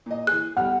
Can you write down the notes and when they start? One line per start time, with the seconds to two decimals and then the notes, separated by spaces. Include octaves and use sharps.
0.06 A#2 D#5
0.27 E3 G#4 F#6
0.57 B1 G3 F#5 F6